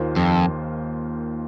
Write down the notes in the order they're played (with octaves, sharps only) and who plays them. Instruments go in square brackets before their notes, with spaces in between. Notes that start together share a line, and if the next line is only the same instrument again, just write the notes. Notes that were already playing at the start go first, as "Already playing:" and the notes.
Already playing: [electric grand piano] D#2 D#3 A#3 F4 C5
[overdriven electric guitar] F2